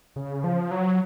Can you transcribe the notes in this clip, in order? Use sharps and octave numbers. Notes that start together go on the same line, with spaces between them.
C#3
F3
F#3